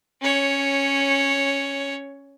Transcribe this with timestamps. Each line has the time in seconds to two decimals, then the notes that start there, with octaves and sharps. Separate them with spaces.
0.22 C#4 C#5